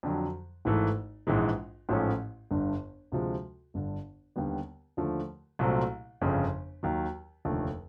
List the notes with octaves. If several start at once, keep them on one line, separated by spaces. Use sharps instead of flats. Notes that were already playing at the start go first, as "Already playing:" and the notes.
F2 D3 F#3
G#1 G#2 E3 A3
A#1 G#2 E3 G#3
A1 G#2 F3 A3 C#4
G1 G2 D3
D2 C3 F3 G#3
G1 G2 D3
D#2 D3 G3 B3
D#2 D3 F3 A3
C2 A#2 F#3 A3 C4
G1 F2 C#3
D#2 D#3 F#3
F1 D#2 D3 F3 A3